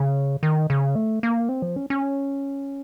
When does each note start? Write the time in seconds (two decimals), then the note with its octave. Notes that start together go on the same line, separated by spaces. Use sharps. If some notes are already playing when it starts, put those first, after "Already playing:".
Already playing: C#3
0.43 D#3
0.70 C#3
0.95 A3
1.23 A#3
1.49 C4
1.62 F3
1.76 C#4
1.90 C#4